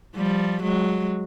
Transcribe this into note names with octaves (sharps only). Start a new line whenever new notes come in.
F3 G3
F#3 G#3